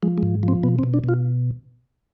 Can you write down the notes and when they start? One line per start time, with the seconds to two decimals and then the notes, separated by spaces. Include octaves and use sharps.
0.03 F3 G#3
0.18 G#3
0.23 G#2
0.43 F3
0.48 C4
0.63 B2 B3
0.79 C4
0.83 B2
0.94 D4
1.04 B2 F4